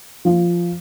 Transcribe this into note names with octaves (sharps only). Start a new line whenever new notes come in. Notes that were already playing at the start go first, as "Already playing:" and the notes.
F3